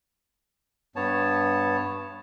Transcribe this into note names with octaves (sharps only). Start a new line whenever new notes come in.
G2 B3 C#5 A5